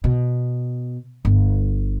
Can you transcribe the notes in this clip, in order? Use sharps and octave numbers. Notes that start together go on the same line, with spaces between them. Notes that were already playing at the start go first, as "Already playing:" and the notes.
B2
G1